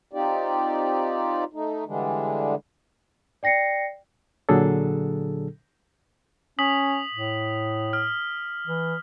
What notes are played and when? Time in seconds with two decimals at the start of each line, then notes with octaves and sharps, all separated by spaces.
0.13 C4 D#4 F4 G4 D5
1.53 A3 D#4
1.87 D3 E3 G3 G#3 D4
3.43 D5 G5 A#6 C7 C#7
4.49 A#2 D3 F#3 D4 G#4 A4
6.59 C#4 D#6 B6 F#7
7.14 A2
7.93 F6
8.67 E3